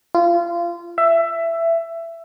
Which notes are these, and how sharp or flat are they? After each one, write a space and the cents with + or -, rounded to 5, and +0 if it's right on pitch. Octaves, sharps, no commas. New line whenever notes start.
F4 -25
E5 +15